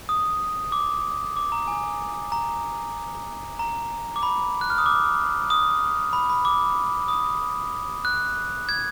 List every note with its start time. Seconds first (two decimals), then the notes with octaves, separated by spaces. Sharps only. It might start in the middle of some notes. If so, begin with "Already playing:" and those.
0.09 D#6
0.72 D6
1.36 D6
1.52 A#5
1.68 G#5
2.32 A#5
3.59 A#5
4.16 D6
4.23 B5
4.61 F#6
4.70 F6
4.78 D#6
4.86 D6
5.50 D#6
6.13 B5
6.30 B5
6.45 D6
7.08 D#6
8.05 F#6
8.69 G#6